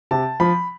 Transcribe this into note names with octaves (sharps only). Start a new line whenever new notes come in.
C3 A5
F3 B5